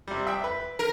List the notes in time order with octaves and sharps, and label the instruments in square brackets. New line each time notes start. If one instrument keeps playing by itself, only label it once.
[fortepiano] C3 G3
E5 G5
B4
[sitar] A#4